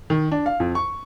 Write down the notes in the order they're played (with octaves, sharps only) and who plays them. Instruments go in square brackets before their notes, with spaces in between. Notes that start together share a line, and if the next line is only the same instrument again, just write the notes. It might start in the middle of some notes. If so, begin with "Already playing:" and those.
[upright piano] D#3
D4
F5
F2
C#6